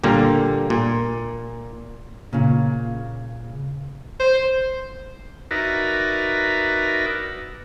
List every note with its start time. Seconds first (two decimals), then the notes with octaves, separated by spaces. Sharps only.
0.04 A#2 D3 G3 A#3
0.70 A#2
2.33 A#2 C#3
4.20 C5
5.51 D#4 F#4 A#4 B4 D5 E5